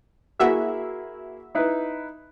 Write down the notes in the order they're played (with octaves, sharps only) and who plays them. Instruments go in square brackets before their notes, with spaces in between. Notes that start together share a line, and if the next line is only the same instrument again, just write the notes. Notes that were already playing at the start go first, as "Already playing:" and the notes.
[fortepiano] A#3 E4 G#4 [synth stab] F#4 E5
[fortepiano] D#4 E4 B4